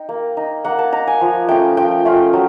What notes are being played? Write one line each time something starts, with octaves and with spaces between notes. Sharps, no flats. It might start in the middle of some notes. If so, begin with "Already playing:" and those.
Already playing: D#4 G5
A#3
D#4
A#3 F#5
A5
D#4 A#5
G#5
F3
A3 C#4 F4 G5
F3 G5
A3 C#4 F4
F#3